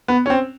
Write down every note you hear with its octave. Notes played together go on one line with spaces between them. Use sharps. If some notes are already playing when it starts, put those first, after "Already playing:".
B3
C#4
C4